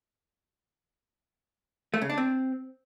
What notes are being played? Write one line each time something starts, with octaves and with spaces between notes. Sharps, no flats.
A3
C#3
D4
C4